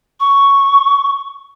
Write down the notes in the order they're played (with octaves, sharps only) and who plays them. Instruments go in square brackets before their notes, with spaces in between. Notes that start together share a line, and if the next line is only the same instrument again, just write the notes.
[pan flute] C#6